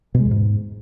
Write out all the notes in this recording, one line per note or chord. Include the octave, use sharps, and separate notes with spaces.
B2
G#3
E2
G#2